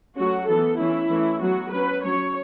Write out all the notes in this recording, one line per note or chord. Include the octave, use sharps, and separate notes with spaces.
F#3 A3 C#4 F#4
E3 B3 A4
E3 A3 C#4 E4
E3 A3 C#4
F#3 B3 F#4
F#3 C#4 B4
F#3 C#4 C#5